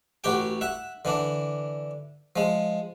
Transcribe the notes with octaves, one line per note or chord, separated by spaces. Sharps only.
A1 F#4 G4 G5
E5 F#5
D3 E3 D4
F3 G#3